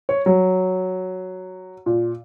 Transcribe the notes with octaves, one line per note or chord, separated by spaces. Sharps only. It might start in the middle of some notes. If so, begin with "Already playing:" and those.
C#5
F#3
A#2